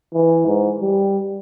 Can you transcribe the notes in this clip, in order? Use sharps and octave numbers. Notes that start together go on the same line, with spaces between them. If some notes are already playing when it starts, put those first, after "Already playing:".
E3
G#2
G3